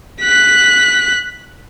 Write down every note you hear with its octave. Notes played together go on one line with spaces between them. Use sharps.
F#6 B6